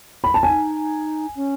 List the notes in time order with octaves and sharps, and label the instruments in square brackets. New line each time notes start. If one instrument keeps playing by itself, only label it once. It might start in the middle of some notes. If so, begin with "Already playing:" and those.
[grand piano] B5
A5
[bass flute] D#4 [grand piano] G#5
[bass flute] C#4